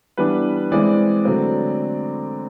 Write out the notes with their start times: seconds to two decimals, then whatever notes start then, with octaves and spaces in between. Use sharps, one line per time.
0.17 E3 G3 B3 D4 B4
0.71 E3 G#3 C4 D5
1.25 D3 F#3 A3 C4